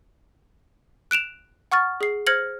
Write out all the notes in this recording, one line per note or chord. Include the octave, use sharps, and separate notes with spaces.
F#6 D7 E7 F7
F#5 C#6 F6 A6
G#4 C7
C5 F6 G#6 A#6 C#7 F#7